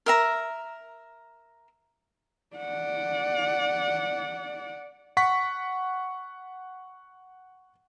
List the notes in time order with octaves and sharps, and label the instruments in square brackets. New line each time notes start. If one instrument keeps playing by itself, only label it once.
[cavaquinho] A#4 E5 A#5
[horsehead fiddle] D5 F#5
[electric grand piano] F#5 C#6 B6